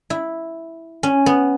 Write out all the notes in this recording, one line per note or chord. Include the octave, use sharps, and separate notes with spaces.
E4
C#4
B3